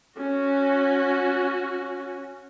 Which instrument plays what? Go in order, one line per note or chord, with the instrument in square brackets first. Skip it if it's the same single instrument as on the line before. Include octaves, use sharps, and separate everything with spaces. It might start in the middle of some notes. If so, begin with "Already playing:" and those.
[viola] C#4 F#4